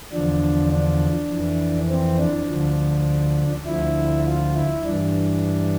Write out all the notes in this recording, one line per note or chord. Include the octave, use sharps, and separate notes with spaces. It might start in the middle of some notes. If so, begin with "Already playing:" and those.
E2 D3 F3 D4
D4
F2 E3
C4
D4
D2 D3 F3
D2 D3 F3 E4
F4
E4
G2 E3 D4